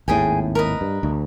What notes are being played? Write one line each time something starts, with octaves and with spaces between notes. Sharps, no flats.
G#1 D#2 A2 G#4 G5 G#5
A#4 B4 D#5
G2
D2